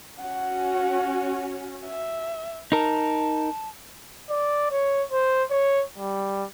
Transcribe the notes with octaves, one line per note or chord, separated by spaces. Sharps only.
C#4 F#4 F#5
E5
D#4 A#4 A5
D5
C#5
C5
C#5
G3